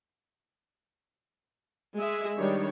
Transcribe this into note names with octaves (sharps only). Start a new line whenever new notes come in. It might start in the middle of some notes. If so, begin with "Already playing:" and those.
G#3 G#4 E5
D#3 G3 D4 C#5